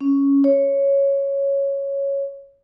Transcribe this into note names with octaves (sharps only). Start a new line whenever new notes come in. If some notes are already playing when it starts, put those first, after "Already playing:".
C#4
C#5